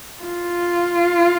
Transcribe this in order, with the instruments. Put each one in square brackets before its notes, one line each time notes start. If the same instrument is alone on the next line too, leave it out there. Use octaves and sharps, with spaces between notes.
[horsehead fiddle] F4